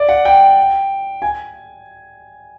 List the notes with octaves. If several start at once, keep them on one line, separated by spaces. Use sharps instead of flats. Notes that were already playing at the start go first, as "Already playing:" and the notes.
Already playing: D5
F#5
G5
G#5